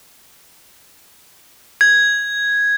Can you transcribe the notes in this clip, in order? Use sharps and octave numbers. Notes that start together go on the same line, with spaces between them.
G#6